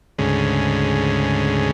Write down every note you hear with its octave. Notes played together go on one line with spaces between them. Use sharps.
D2 G#2 C#3